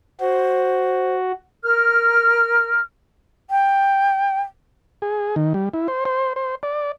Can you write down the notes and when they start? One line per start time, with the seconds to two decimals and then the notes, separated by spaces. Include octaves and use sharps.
0.20 F#4 C5
1.64 A#4 F6
3.50 G5
5.02 G#4
5.36 D#3
5.54 G3
5.74 E4
5.88 C5
6.05 C5
6.36 C5
6.63 D5